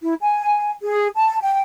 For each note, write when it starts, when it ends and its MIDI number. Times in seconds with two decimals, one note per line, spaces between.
0.02 0.14 64
0.22 0.70 80
0.83 1.09 68
1.16 1.38 81
1.41 1.61 79